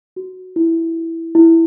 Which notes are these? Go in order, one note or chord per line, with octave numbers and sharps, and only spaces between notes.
F#4
E4
E4